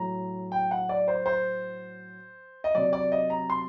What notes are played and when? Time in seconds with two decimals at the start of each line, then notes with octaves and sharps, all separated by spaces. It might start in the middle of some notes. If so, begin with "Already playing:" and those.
Already playing: A2 F#3 A#5
0.52 G5
0.71 F#5
0.89 D5
1.08 C5
1.26 C5
2.64 D#5
2.75 C3 F#3 D5
2.93 D5
3.12 D#5
3.30 A#5
3.50 C6